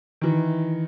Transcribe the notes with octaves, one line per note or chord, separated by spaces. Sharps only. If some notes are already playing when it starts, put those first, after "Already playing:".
D#3 E3